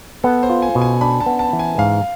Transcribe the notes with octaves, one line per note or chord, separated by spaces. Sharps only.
B3 A4
C5
F4
G#5
B2
G#5
D4 B5
A5
B3
A5
E3
G#5
G#2 F5